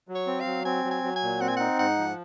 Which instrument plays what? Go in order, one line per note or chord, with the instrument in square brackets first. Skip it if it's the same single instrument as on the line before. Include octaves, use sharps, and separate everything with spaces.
[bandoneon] F#3
[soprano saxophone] C#5
[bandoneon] C4
[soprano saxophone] F5
[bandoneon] F#3
[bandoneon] C4 [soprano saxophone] G#5
[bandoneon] F#3
[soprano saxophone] G#5
[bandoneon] F#3
[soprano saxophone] G#5
[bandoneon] A#2
[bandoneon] C4 [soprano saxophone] F#5
[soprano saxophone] G#5
[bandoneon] D#4 [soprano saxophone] F#5
[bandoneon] G#2 [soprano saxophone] F#5
[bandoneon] F3